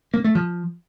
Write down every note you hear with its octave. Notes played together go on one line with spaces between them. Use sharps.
A#3
A3
F3